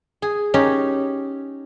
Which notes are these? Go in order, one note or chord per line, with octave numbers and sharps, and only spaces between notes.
G#4
C#4 D#4 G4